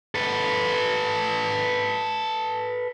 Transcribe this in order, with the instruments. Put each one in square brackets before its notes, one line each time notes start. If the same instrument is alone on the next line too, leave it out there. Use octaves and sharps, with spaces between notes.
[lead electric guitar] A4 B4